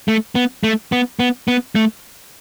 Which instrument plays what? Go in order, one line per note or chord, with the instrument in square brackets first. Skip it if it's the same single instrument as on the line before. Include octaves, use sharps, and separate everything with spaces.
[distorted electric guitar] A3
B3
A3
B3
B3
B3
A3